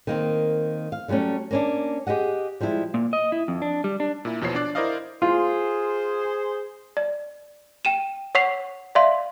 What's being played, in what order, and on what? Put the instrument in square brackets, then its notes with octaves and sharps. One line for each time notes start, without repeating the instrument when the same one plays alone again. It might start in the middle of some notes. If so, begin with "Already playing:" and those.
[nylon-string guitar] D#3 A#3 C4
F5
D3 F#3 G3 A3 C#4
A#3 C#4 D4
G4 G#4 D#5 F#5
F3 G3 G#3 E4
[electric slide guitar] A#2
D#5
E4
F2
D4
G3
D4
[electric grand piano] A#2 E4
E2 B2 F3 C#5 C7
D4 D5 F#6
E4 A#4 C5 D5 D#5 F5
[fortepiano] F4 [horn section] G#4 C5
[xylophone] D5
G5 D#7 E7
C#5 F#5 C#6 B6 C7 F7
D5 E5 F5 C6